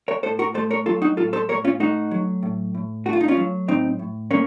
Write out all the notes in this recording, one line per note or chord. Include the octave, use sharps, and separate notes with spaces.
A#4 C#5
A2 A4 C5
F#4 A#4
A3 A4 C5
A#4 C#5
F#3 F4 A4
D#4 F#4
A2 F4 A4
A4 C5
A2 A#4 C#5
C#4 F4
A3 D#4 F#4
F#3
A2
A2
A3 F#4
F4
D#4
C#4 F4
F#3
A2 C4 D#4
A2
A3 A#3 C#4